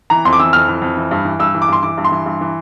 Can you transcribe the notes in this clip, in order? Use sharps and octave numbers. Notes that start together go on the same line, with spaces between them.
E3 A#5
F2 C6
D6
E3 E6
F2 F6
E3
F2
E3
G2
E3
G2 E6
E3
D6
G2 C6
E3 D6
G2
C6
E3
G2
E3